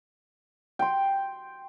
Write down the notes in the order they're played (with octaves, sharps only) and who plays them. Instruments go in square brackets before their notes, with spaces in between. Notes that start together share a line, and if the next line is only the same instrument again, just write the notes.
[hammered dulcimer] G5 C6